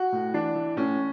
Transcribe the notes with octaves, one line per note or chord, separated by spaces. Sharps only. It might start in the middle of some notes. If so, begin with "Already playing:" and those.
Already playing: F#4
A2
E3 D4
E3
A2 C#4